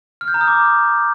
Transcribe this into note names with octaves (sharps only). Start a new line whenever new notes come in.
F6
G6
A#5
D#6
D6